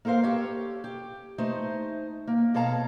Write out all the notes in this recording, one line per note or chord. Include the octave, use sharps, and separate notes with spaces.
A#3 A4 A#4 C5 F5
G4 A4 C#5
G4
A3 D#4 C5
A#3
B2 A4 C#5 F5 A5 A#5